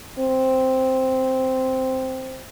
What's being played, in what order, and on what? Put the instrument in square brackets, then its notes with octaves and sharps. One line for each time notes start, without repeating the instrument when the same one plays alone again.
[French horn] C4